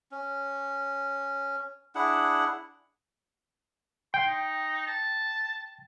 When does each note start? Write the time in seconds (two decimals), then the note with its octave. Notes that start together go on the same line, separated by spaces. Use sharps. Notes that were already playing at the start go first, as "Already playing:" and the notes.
0.12 C#4
1.95 D4 E4 G#4 F#5
4.14 G5 C6
4.26 D#4
4.86 A5